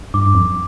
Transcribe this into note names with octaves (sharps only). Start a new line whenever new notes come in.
G2 D6
F2